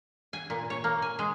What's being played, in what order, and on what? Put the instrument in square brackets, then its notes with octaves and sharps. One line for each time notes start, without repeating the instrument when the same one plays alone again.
[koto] G#5
A#2
C#5
A#3
G#5
G#3